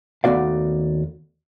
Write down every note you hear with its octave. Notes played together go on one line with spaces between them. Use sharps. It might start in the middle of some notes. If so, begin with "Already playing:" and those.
D#2 A3 B3 F#4 D5 F5